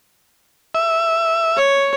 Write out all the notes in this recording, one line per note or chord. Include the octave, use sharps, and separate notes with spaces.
E5
C#5